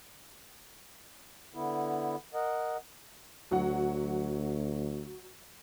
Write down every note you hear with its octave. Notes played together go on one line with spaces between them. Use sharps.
D3 B3 E4
A#4 D#5 F#5
D2 F#3 F#5